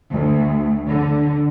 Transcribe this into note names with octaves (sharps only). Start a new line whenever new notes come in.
D2
D3